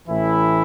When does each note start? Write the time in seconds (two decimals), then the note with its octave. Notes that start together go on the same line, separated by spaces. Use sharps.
0.08 A1 A2 E3 E4